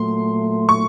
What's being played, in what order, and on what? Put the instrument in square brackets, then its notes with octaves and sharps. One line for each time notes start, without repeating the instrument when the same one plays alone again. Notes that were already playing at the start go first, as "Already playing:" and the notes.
Already playing: [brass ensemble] A#2 F#3 A3 [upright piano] C6
[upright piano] C#6